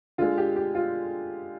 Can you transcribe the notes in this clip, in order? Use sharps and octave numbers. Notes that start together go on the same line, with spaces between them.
D3 G#3 F4
G4
G4
F4